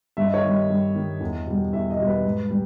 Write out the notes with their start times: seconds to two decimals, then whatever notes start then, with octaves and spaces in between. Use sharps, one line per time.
0.17 G2 E5
0.26 D#5
0.34 C#5
0.43 D#3 G3 D#5
0.70 G2
0.95 D#3 G3
1.20 E2
1.47 B2 G3
1.73 E2 E5
1.90 D#5
1.99 B2 G3
2.07 B4
2.25 G#2
2.51 G3